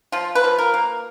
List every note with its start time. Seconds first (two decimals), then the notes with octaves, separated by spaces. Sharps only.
0.12 F3 F4
0.35 B4
0.44 F3
0.58 A#4
0.74 A#3